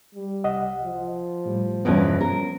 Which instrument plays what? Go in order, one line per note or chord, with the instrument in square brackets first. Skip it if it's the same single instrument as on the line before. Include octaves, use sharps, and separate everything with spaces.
[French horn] G3
[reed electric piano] C2 D#5 F#5
[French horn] F3
[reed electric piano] A2 G3
[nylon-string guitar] E2 G2 B2 [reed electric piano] B3 C#4
[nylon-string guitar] A#4